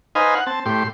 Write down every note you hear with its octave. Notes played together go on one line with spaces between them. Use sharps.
D#4 B4 C5 D#5 F5 G#5
F#5
C4 A5
A2 G4 C6